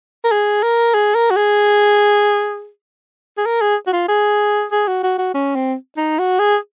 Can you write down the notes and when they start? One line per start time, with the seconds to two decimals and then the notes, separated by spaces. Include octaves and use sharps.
0.24 A#4
0.32 G#4
0.63 A#4
0.94 G#4
1.15 A#4
1.31 F#4
1.37 G#4
3.38 G#4
3.46 A#4
3.61 G#4
3.87 F#4
3.93 F4
4.09 G#4
4.72 G#4
4.88 F#4
5.03 F#4
5.19 F#4
5.34 C#4
5.55 C4
5.97 D#4
6.19 F#4
6.39 G#4